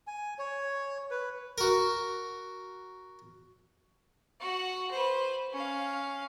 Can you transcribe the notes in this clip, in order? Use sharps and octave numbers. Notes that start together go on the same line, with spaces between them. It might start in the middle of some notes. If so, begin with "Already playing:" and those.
G#5
C#5
B4
F#4 A#4
F#4 F#5
B4 C5
C#4 F5